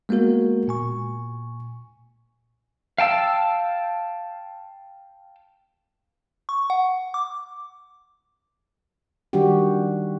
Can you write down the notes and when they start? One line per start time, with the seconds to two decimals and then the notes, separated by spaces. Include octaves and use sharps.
0.09 G#3 A#3 B3 F#4 A#4
0.68 A#2 G#5 C#6
2.98 F5 G5 A5 E6
6.49 C#6
6.70 F#5
7.14 D6
9.33 D#3 G3 D4 F#4 G4